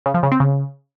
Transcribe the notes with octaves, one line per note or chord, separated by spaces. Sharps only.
C#3
F3
C#3
C4
C#3